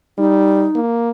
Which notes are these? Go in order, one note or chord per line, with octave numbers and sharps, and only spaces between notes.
G3 D#4
A#3